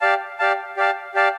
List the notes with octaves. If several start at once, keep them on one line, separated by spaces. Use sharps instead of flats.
G4 D5 F5 A5
G4 D5 F5 A5
G4 D5 F5 A5
G4 D5 F5 A5